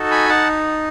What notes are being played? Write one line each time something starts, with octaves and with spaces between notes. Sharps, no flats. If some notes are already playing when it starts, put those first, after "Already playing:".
Already playing: D#4 F#4 A4
G#5 B5
D#4 F#5 A5